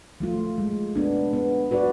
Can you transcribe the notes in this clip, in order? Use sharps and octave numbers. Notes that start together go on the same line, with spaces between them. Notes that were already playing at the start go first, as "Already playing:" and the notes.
F3 A3 F4
G#3
B3 D4
B3
F#4 B4 D5